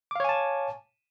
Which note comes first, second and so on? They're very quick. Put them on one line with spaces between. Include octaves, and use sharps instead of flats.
D6 F5 C#5 G#5 A5